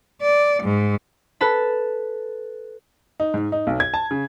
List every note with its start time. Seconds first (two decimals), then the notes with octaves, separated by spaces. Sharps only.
0.22 D5
0.62 G#2
1.41 A4 B4 A5 B5
3.20 D#4
3.34 G#2
3.52 D#4
3.67 B1
3.80 G#6
3.94 A5
4.11 C#3